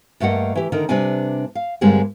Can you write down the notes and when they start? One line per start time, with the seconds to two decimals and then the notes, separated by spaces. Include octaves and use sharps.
0.20 G2 A3 A#3 D#5 F#5
0.55 E3 G4
0.72 D3 D#3 A#4
0.89 C3 G3 D4 B4 G#5
1.55 F5
1.81 G2 D3 G3 G#3 A#3 C4